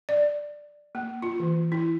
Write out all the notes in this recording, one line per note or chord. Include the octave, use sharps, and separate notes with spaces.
D5
A#3
F4
E3
E4